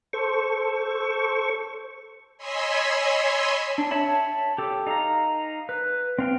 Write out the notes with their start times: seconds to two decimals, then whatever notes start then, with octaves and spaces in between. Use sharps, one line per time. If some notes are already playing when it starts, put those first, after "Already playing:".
0.13 A4 C5 C#6
2.37 C#5 D#5 G#5 B5 C6 E6
3.78 D4
3.91 C#5 E5 A5 B5
4.58 G4 A4
4.87 D#4 F5 A#5
5.69 B4
6.19 C4 F5 G5